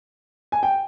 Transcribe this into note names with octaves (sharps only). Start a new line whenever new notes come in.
G#5
G5